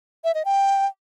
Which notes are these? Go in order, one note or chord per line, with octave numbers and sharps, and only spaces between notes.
E5
D#5
G5